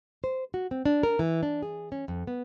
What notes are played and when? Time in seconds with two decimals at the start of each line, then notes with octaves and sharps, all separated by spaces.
0.24 C5
0.54 F#4
0.71 C4
0.85 D4
1.03 A#4
1.19 E3
1.43 D4
1.62 G#4
1.92 C#4
2.08 F2
2.27 B3